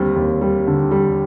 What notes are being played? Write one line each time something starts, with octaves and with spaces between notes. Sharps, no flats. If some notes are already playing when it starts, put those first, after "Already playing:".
Already playing: D#2 D3 G3 C4
D#2
G3
D3
G3